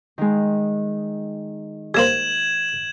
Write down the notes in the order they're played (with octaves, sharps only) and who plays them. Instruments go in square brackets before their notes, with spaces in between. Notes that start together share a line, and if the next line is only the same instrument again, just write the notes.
[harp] D#3 G#3
[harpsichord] G3 A#3 C5 [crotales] G#6 E7 F#7